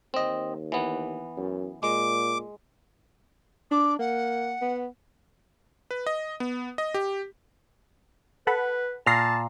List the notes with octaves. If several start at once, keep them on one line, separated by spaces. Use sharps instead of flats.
D#2 C4 D#5
E3 B3
F#2
A#2 G#3 D6
D4 D6
A#3 F#5
B3
B4
D#5
B3
D#5
G4
A4 B4 F#5 B5
A#2 A5 F6 A#6 C7